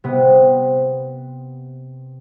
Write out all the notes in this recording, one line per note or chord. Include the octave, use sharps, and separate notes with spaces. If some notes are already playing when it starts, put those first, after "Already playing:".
C3 B3